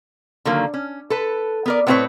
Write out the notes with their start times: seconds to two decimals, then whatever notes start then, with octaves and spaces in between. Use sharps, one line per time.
0.45 D3 D#3 F#3 A#3
0.74 C#4
1.10 A4 B4
1.66 B3 A#4 D5
1.87 A2 B3 C4 F4 B4 C#5